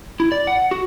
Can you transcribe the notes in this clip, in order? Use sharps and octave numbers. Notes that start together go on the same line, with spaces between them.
E4
D5
F#5
F#4